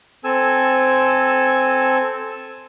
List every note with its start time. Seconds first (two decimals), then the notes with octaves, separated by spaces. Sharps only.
0.24 C4 A4 G#5 E6